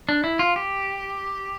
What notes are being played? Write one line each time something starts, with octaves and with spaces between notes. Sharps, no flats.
D4
E4
F4
G4